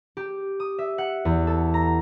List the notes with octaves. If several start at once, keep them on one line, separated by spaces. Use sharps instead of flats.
G4
D#6
E5
F#5
E2
A4
A#5